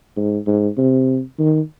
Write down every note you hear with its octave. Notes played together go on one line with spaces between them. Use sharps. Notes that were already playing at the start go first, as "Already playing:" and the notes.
G#2
G#2
C3
D#3